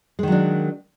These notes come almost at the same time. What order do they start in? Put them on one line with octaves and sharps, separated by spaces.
G#3 D#3 F#3 D4